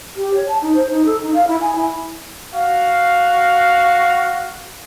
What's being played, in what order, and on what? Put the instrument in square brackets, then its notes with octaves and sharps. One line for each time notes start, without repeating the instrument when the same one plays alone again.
[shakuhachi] G4
C#5
A5
D#4
C5
D#4
A4
D#4
F5
E4
G#5
E4
[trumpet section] F#4 F5